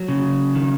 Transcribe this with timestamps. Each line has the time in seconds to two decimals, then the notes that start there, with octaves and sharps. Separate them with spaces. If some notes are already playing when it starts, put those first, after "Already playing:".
Already playing: F#3
0.08 C#3
0.55 D#3